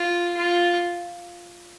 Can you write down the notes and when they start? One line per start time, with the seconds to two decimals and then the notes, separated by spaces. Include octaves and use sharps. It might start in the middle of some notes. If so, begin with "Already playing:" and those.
Already playing: F4
0.37 F4